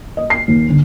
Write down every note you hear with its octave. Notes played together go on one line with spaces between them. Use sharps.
D#5
C7
D#2
D3